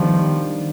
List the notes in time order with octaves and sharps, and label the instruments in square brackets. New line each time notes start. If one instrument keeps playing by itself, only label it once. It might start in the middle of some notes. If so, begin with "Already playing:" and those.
Already playing: [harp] D#3 G3 B3 D4 G4 [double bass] F3